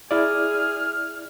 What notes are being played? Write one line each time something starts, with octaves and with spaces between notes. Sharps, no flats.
E4 G#4 D5 F6